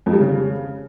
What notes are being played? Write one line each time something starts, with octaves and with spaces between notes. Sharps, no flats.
F2
G3
C#3